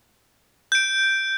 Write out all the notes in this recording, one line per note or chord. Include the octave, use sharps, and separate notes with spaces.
G6 D7